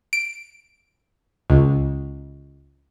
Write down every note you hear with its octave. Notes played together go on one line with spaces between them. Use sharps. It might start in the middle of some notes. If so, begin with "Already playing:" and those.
D7
C#2